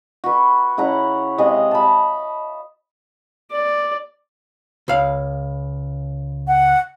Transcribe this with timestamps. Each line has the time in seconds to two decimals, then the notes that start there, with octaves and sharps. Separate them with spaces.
0.24 F#4 B4
0.77 C#3 E4 F#5 A#5
1.38 C3 G#3 D#5 F5
1.71 A5 B5
3.51 D5
4.88 C#2 F5
6.48 F#5